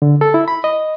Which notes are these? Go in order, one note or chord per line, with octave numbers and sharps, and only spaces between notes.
D3
A4
E4
B5
D#5